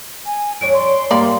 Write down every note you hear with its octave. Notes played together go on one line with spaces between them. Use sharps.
G#5
F2 D4 C#5 D7
C6
G2 G3 A#3 D5